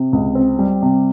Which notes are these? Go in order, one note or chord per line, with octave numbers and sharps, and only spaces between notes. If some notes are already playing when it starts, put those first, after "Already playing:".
Already playing: C3
C#2
C4
G3
C3